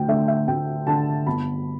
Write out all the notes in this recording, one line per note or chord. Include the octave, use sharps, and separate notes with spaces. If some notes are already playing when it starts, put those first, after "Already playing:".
Already playing: D2 G5
D3 A3 E5
E5
D2 G5
D3 A3 A5
G1 B5